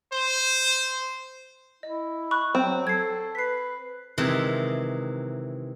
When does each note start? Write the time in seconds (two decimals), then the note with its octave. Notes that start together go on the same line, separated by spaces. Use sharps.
0.13 C5
1.83 E4 D#5
2.31 B5 C#6 F#6
2.55 F#3 C4
2.87 A4 G#6 C7
3.35 B4 B6 C7
4.18 C3 D#3 E3 G#3